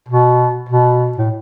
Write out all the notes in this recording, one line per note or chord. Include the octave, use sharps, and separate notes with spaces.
B2
B2
A2